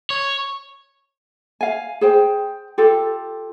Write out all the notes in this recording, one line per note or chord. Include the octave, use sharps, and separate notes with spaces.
C#5
F5 G#5
G#4 C5 G5
F4 G4 A4